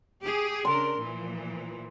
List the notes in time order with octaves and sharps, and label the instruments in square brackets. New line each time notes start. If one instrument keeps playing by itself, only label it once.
[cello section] G4 G#4
[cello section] C#3 D4 A#4 [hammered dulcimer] C6
[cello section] A#2 E3 F3